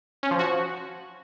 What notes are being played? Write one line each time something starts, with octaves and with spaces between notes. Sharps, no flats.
C#4
F3
F#4